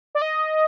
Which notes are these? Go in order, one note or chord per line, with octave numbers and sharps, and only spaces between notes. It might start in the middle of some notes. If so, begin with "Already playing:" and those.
D5
D#5